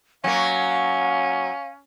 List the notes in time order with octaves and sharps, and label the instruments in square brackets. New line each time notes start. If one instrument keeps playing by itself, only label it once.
[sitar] F#3 A#3 [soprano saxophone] C#4 [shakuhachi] F5